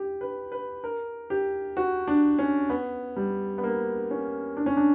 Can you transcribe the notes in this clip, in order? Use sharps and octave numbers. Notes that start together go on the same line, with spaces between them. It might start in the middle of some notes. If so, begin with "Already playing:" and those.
Already playing: G4
B4
B4
A#4
G4
F#4
D4
C#4
B3
G3
B3
A#3
C#4
D4
C#4
D4